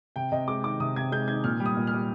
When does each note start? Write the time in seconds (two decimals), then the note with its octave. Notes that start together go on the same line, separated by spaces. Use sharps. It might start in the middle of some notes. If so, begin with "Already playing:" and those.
0.16 C3 G5
0.32 C3 D#5
0.48 G#3 D6
0.64 D#3 D6
0.80 C3 D#6
0.96 C3 G#6
1.12 G#3 G6
1.28 D#3 G#6
1.44 A#2 F6
1.60 G3
1.66 D#6
1.77 A#2
1.87 F6
1.93 G3